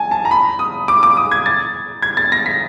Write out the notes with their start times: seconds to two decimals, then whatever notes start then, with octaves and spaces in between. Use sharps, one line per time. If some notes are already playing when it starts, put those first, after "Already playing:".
Already playing: G#5 A5
0.11 A5
0.25 A#5
0.31 B5
0.59 D#6
0.88 D6
1.03 D6
1.17 D#6
1.31 G#6
1.46 A6
2.02 G#6
2.17 A6
2.32 A#6
2.46 B6